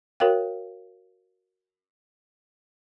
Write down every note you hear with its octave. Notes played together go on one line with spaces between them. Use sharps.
F#4 A#4 C#5 F5 G5